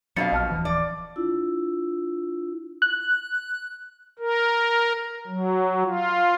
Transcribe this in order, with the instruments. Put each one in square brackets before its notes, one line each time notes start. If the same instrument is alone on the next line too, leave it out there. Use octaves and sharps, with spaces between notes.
[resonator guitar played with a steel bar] F2 B2 F5 [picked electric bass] F#3 D4 [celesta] A6 C#7
[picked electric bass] A#1 [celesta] D#5 A5 F6
[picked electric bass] D1 E3 F3
[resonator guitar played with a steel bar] D5
[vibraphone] D4 E4 F4 E6
[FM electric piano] F#6
[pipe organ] A#4
F#3
F4